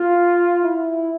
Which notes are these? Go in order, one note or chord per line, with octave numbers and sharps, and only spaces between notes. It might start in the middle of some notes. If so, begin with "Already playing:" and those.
Already playing: F4
E4